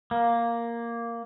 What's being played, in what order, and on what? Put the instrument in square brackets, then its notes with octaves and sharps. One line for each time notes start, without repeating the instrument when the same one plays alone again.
[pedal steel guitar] A#3